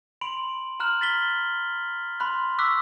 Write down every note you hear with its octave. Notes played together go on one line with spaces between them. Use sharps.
B5 C6 D7 F7 F#7
A#5 B5 F6 F#6 F#7
A6 B6 G7
B5 C6 F#6
C#6 D6 E6 F#6 B6